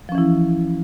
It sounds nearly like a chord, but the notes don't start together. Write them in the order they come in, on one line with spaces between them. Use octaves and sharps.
F3 C#4 E3 E4